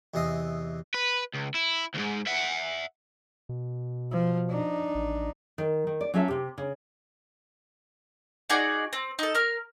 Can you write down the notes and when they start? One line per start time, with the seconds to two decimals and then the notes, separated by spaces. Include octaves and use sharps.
0.14 E2 C3 E3 D#5 C6 D#6
0.94 B4
1.34 C#2
1.55 E4
1.95 D2 G#2
2.27 E5 F#5
3.49 B2
4.11 F3
4.50 D4 D#4
4.95 A1
5.58 D#3
5.87 D#3
6.01 D5
6.14 F#3 C#4 F4 A4 E5
6.28 C3 G4
6.58 C#3
8.49 D#4 F#4 G#4 D5
8.93 C4
9.19 D#4 A4
9.35 A#4 F6